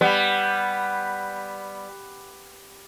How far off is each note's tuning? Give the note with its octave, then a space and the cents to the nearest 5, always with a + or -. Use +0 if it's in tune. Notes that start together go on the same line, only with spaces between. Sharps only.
G3 +5 B3 +5